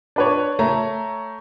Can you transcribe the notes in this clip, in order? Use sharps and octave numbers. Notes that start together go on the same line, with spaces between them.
D4 B4 C#5
A3 C#5 A#5